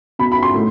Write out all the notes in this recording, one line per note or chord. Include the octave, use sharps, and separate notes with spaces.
B2 B5
B5
C6
A2